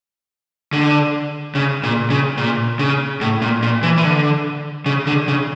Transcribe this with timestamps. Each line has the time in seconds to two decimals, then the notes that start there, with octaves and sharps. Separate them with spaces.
0.73 D3
1.55 C#3
1.83 A#2
2.10 C#3
2.38 A#2
2.79 C#3
3.21 A2
3.42 A#2
3.63 A#2
3.83 E3
3.98 E3
4.04 D3
4.86 C#3
5.07 D3
5.28 C#3